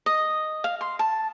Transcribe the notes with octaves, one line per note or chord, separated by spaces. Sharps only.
D#5
F5
C6
A5